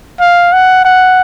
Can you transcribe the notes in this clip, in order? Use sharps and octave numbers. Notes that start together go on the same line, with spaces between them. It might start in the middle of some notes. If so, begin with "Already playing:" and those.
F5
F#5
F#5